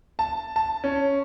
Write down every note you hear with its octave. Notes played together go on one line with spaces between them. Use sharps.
A5
A5
C#4